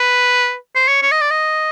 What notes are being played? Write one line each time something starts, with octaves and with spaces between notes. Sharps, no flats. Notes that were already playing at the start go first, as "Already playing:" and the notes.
Already playing: B4
C5
C#5
C#5
D#5
D5
D#5